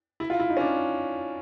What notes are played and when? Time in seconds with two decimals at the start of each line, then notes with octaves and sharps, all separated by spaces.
0.20 E4
0.30 F4
0.40 E4
0.50 D#4
0.57 C#4
0.60 D4